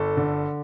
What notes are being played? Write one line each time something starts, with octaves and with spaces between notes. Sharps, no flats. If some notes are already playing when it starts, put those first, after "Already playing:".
Already playing: G1 A4
D3